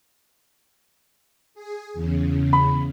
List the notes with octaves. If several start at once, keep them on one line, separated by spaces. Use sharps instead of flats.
G#4
E2 C#3
B5